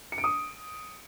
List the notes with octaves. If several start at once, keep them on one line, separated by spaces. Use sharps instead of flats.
C#7
D7
D#6